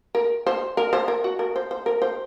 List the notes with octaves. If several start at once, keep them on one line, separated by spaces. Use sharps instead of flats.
A#4
C5
A#4
C5
A#4
F#4
A#4
C5
C5
A#4
C5